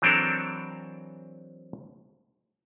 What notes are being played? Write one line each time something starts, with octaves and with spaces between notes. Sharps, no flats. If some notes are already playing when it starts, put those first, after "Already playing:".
E3 F#3 C4 D4 A4 A#4